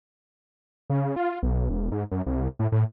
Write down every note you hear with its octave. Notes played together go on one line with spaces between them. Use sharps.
C#3
F4
B1
E1
G#2
F#2
C2
A2
A2